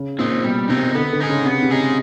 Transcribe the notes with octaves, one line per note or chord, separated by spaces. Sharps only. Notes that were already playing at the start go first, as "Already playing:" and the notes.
Already playing: C#3
A#2 C4 D#4
B2 G3
C3 C4 D#4
D3 B3
D3
D#4 G#4
C#3
C3 B3
C3
C#3 D#4 G#4